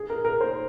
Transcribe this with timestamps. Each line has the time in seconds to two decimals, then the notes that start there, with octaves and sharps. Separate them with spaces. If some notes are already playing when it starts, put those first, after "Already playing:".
Already playing: G#4
0.10 A#4
0.25 A#4
0.41 C5